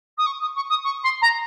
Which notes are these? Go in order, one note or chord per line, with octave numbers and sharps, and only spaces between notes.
D#6
C#6
D#6
C#6
D#6
C#6
C6
A#5